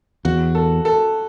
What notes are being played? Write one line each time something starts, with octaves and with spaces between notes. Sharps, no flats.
E2 F#4
A4
A4